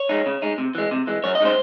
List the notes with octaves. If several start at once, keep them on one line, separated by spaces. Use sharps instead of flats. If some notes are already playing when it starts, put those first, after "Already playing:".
Already playing: C#5
G#3 D#4
C#3
G#3 D#4
C3
E3 G#3
C3
E3 G#3
F#2 C#5
D#5
C#3 G#3 D#4 C5